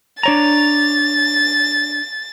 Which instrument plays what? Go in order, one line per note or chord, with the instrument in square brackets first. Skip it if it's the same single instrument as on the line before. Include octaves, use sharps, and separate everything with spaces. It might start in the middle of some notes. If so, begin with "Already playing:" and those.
[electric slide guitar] D4 C#5 A#5 [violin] A6